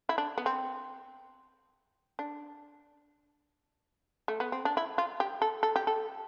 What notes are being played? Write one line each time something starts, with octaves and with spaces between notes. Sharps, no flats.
E4
D4
B3
C4
D4
A3
B3
C4
D4
E4
F4
G4
A4
A4
G4
A4